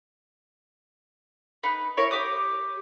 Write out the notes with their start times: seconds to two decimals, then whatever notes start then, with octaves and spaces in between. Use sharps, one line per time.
1.63 D#4 B4
1.97 E4 A#4 C#5
2.11 G4 D6 D#6